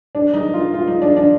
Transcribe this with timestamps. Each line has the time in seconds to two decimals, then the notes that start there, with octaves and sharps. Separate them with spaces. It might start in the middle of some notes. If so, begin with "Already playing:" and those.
0.15 D4
0.34 D#4
0.54 F4
0.74 F4
0.87 D#4
1.02 D4
1.17 D4